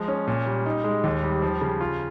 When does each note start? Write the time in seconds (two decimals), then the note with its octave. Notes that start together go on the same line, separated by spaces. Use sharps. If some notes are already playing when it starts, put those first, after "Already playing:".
Already playing: F3 G#3
0.08 C#4
0.27 A#2
0.46 G3
0.66 D#4
0.84 G#3
1.04 D#2
1.23 G3
1.42 F3
1.61 C#3
1.81 F4